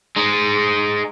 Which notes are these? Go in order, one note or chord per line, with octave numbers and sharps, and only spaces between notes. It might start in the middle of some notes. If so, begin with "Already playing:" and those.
G#3 D#4